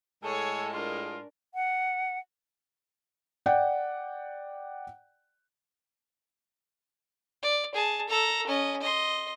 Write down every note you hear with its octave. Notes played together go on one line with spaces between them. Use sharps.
A2 G#3 G#4 A4 C#5
D4 F4 A#4
F#5
D5 F#5 G5
D5
G#4 A5
A4 A#5
C#4 D#5
D#5 C6